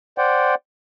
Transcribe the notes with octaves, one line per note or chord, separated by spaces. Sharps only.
C5 D5 F#5 G5